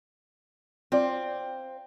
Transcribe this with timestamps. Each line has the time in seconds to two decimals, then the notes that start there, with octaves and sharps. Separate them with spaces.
0.92 C4 F4 D5